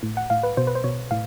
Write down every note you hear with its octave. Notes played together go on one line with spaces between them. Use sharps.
A2
F#5
A2 F5
B4
B2 C5
B4
C5
B2 C#5
A2 F5